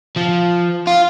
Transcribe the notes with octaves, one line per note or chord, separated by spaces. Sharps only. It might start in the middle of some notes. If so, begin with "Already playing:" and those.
F3
F4